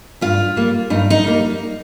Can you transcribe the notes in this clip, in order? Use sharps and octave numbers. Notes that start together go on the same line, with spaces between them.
G2 F4
G3 A#3
G2 D#4
D#4
G3 A#3